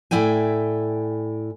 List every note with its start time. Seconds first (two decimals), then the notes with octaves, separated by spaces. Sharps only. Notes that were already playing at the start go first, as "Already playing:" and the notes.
0.11 A2 E4 D5 G5 G#5